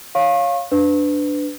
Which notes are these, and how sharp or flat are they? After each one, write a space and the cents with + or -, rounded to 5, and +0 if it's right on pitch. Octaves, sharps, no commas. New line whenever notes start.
C#5 +0 F5 +0 C#6 -35
D4 +0 B4 +25